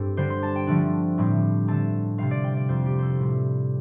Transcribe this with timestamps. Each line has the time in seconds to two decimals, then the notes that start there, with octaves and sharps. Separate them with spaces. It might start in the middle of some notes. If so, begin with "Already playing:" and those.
Already playing: G2 C4 G4 A4
0.17 D3 G3 D4 C5
0.30 C6
0.43 A5
0.55 G5
0.67 D3 F3 A3 D4
1.18 A2 G3 C4
1.68 D3 A3 C4 A5
2.18 C3 G3 C4 F5
2.31 D5
2.44 G5
2.57 D5
2.68 F2 F3 C4 C5
2.86 G4
2.99 A4 C5
3.19 A2 G3 C4